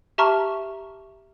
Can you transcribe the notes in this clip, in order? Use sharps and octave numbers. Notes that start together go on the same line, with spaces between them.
G4 E5 A5 A#5 C#6 F6